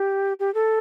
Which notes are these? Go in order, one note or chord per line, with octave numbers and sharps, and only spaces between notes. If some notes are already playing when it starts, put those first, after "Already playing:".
Already playing: G4
G4
A4